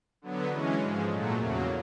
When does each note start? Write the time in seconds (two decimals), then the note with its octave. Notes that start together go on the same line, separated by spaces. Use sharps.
0.22 D3 F#3 B3
0.51 E3 G#3 C#4
0.81 G#2 F3 G#3
1.10 A#2 F#3 A3
1.38 E2 C#3 F#3 A#3